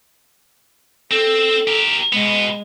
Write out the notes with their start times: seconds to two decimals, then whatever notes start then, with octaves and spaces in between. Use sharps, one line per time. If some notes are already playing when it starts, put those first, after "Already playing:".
1.11 C4 A4
1.67 G4 A#4
2.13 B2 G#3 B3